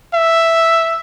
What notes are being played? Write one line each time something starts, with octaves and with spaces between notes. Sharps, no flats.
E5